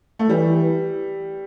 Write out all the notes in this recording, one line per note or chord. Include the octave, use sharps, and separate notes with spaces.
A3
E3 G3